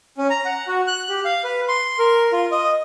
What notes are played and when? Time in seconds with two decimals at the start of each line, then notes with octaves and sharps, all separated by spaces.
0.18 C#4
0.30 A#5
0.45 F#5
0.68 F#4
0.87 F#6
1.09 G4
1.25 F5
1.44 B4
1.68 C6
1.99 A#4
2.32 F4
2.52 D#5